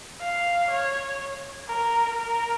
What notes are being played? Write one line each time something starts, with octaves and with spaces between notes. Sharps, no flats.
F5
C#5
A#4
A#4